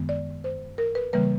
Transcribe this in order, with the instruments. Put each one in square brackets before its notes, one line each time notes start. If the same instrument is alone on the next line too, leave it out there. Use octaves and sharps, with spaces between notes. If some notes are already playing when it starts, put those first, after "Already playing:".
Already playing: [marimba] F#2 D#3 G#3 B3
D5
C5
A#4
B4
C#3 E3 G3 A#3 B4